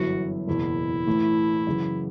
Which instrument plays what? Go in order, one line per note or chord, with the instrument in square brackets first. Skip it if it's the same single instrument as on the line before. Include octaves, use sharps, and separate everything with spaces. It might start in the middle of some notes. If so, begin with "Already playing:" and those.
Already playing: [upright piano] G1 F#2 E3 B3 E4 [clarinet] F#4
[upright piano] F#1 E2 B2 [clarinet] E4
[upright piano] A1 A2 E3 A3
F#2 C#3 E3